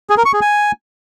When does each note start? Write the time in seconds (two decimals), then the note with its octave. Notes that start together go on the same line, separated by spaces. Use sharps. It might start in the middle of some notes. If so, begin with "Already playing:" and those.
0.10 G#4
0.18 A#4
0.26 C#6
0.33 G#4
0.41 G#5